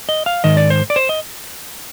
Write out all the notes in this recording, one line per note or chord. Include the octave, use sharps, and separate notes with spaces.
D#5
F5
G#2 D#3 D#5
D5
C5
D5
C5
D#5